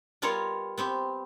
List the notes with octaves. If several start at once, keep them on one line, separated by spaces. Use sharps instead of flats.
G3 B3 F4 A#4 C#5
B3 C4 G4